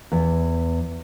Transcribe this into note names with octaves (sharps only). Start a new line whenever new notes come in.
E2